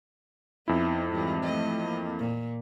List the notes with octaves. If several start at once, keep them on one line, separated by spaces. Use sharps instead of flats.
F2 B3 D#4 E4
G#2 E3 G3
A3 D#5
A#3
A#2